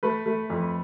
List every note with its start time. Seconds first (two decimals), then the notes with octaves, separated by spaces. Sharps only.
0.03 A3 B4
0.26 A3
0.50 F2